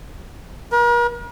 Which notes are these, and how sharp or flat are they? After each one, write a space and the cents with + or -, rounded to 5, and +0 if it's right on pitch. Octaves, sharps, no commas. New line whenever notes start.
A#4 +40